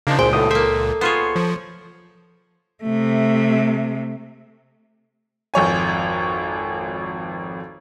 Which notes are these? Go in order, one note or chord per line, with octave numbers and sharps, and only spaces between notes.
C#3 F3 A#3 D4 D#4
G#1 C#2 A#2 G#4 C5 G5
B1 E2 A2 A4 D#6
A#3 C5 E5
B3 F4 G#4 C5 C#5
F3
C3 A3
G#1 F2 C#5 G#5